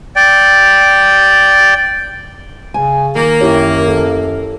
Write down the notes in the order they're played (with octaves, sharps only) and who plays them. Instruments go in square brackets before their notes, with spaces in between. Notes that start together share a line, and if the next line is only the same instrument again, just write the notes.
[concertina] D5 G5
[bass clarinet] C#3 [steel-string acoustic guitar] G#5
[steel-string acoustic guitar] D#3 [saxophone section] A#3
[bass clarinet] F#2 [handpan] E4 G4 C#5
[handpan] A4